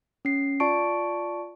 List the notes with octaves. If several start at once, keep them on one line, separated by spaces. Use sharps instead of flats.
C#4 C7
F4 D5 A5 C#6 D7